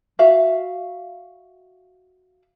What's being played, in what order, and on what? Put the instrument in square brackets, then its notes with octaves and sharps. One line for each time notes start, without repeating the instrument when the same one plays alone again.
[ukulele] F#4 E5 F5